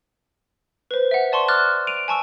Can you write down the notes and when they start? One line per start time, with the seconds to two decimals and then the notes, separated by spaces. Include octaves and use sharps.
0.91 B4 C5
1.11 E5 F#5
1.32 D5 A5 C6 C#6
1.48 D6 F6 F#6 A6
1.87 D7 D#7 F7
2.08 G#5 A5 C#6 E6